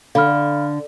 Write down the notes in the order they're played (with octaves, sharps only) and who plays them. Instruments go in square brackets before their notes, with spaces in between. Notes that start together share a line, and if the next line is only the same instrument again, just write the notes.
[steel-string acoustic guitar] D3 [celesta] F5 B5 F6